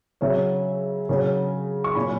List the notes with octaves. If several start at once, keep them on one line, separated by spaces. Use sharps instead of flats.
C#3 F#3 C#5 E5
C#3 F#3
C#6
A#2 F#3 G#5 B5